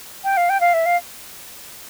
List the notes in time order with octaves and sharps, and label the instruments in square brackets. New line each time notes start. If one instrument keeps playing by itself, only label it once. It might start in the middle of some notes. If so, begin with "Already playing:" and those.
[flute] G5
F5
G5
F5
E5
F5